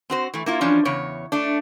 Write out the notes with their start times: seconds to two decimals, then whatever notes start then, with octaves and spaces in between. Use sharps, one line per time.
0.10 C4 F#4 C5
0.34 E3 A3
0.46 A#3 E4 F4
0.61 E3 F3 C#4 D4
0.85 E2 C#3 C#5
1.32 A3 D4